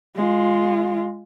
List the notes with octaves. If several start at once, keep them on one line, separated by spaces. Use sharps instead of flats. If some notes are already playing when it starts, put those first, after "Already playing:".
G#3 F4